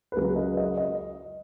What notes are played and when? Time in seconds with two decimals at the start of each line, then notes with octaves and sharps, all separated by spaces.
0.12 B4
0.16 C#2 C#3 F#3 A#4
0.36 D#5
0.57 D#5
0.77 D#5